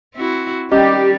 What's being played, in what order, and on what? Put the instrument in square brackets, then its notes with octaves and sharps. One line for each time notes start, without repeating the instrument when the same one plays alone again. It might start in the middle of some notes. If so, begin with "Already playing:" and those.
[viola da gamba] C4 E4 F#4
[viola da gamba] D#3 G3 D5 [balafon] C#4 D#5 [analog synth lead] G4